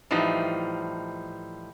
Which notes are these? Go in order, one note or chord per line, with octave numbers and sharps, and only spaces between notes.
A2 E3 F3 G3 D#4